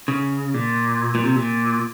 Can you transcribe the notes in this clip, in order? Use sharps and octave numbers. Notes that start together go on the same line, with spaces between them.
C#3
A#2
A#2
C3
A#2